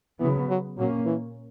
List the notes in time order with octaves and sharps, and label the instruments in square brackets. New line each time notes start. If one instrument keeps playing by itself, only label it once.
[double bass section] C#3 F#3 B3 [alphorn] E3
[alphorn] F#3
[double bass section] A#2 A#3 C#4 [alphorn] F#3
[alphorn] E3